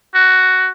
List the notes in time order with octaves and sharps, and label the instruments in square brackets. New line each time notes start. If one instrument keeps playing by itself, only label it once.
[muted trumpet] F#4